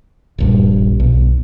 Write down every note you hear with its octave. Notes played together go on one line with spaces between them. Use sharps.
D#1 A#1 G2
B1